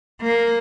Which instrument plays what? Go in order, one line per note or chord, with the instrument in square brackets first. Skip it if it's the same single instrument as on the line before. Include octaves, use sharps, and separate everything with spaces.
[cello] A#3